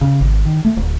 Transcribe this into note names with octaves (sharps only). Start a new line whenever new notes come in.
C#3
G#1
D#3
A3
D1